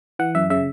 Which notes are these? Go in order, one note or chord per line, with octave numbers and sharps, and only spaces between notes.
E3 F#5
F#2 E5
C#3 E5